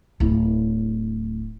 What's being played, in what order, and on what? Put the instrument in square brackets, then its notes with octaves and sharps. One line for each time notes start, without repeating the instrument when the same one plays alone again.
[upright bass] D1 E4